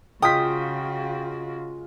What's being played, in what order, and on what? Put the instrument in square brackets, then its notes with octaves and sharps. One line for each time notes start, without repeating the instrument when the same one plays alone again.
[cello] C#3 F#4 [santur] G#3 F4 D#5 [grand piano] G5 B6 [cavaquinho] D#6